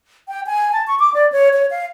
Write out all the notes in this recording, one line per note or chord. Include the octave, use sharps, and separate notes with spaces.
G5
G#5
A5
C#6
D6
D5
C#5
C#5
F5